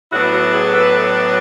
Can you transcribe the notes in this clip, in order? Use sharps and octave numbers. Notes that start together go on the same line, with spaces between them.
A2 F#3 B3 D4 E4 F#4
E4 F#4
F#4 G#4
A4 B4